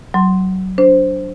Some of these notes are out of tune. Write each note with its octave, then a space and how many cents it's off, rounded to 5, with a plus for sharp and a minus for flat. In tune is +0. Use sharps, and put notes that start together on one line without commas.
F#3 +20 C6 +0
D4 -10 C5 +0